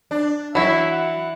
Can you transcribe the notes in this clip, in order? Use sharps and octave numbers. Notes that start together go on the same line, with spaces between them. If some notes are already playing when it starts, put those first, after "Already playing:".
D4
E3 F#3 E4 E5 B5
F#5